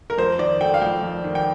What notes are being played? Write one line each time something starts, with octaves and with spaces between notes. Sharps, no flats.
A#4
F2 C5
D#3 D5
A3 G5
F5
F2 G5
F2
D#3
G5